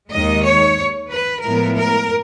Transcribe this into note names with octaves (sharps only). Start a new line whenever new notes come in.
D#2 D#3 G#3 D#5
C#5
B4
A2 F3 G#3 B3 E4 A#4
A#4